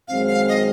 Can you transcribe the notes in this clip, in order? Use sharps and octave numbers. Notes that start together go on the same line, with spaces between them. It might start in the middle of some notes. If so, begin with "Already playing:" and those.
F#2 D#3 G#3 C4 F5
F5
D#5